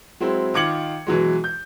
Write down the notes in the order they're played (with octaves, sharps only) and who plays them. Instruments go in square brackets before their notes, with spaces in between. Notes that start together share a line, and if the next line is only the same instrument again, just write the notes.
[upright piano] F#3 G#3 C4 E4
D#3 F4 D6 G#6 C#7 F#7
B2 E3 F#3 G#3
G6